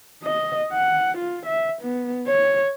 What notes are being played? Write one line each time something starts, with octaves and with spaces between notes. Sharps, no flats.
D#5
F#5
F4
E5
B3
C#5